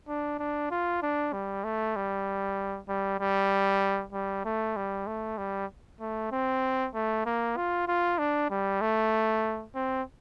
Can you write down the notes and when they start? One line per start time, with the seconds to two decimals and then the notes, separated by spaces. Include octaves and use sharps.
0.08 D4
0.39 D4
0.71 F4
1.03 D4
1.33 G3
1.64 A3
1.96 G3
2.89 G3
3.20 G3
4.13 G3
4.45 A3
4.76 G3
5.07 A3
5.38 G3
6.01 A3
6.32 C4
6.95 A3
7.26 A#3
7.57 F4
7.88 F4
8.18 D4
8.50 G3
8.81 A3
9.75 C4